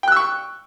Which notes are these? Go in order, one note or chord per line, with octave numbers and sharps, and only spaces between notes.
G5 C#6 E6 F#6